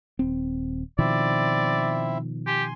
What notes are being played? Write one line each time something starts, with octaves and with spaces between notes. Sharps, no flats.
D#1 C4
B2 D#3 F3 C4 E4 D5 E5
G4 G#5 C6